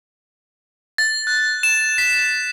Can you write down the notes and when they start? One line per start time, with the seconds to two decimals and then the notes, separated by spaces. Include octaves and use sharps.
0.98 A6
1.27 F#6
1.63 E7
1.98 B6